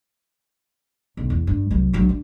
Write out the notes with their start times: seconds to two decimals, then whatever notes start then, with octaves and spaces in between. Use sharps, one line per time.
1.17 B1
1.30 E2
1.47 G2
1.71 C2 F#3
1.93 A#1 F#3
2.09 D3